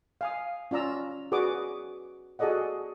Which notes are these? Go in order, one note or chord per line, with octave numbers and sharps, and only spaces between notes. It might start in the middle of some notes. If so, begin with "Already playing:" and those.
F5 G#5 D#6
C#4 F4 D5 A#5 E6
F#4 G#4 B4 D5 D6 D#6
F#4 G#4 A4 D5 D#5 F#5